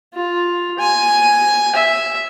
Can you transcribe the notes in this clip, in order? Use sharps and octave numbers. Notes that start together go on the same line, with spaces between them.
F4
G#5
E5